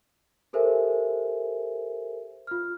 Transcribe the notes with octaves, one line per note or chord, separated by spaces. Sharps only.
G4 A4 A#4 C5 E5 G#5
F4 F6